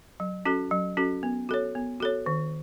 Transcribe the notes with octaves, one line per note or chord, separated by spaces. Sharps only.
F#3
C#4 F#4 A4
F#3
C#4 F#4 A4
B3
F#4 A4 C#5
B3
F#4 A4 C#5
D#3